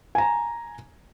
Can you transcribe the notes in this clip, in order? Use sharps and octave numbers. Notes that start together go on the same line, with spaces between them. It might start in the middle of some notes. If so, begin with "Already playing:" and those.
G#5 A#5